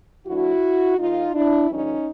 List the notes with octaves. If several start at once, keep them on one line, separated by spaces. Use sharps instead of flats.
D2 D3 F3 E4 F#4
D#2 D#3 D#4 F4
D4 E4
G2 D3 F3 C#4 D#4